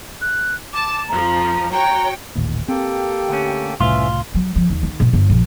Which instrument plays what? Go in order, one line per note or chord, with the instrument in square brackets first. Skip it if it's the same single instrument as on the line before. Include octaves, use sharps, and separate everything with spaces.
[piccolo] F#6
[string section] A5 [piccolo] D6
[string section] F2 F3 [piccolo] A#5
[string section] F#4 C#5 G5 [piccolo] A#5
[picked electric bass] D#1 A1 D#2
[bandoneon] A#3 A4 G5 [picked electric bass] C4 [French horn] G4
[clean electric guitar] D2 C#4
[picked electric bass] F#1 C2 A2 [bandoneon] E3 C#4 E5 [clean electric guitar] F4
[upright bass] F#3
F3
D#2
D#3
A#1
G1
A#1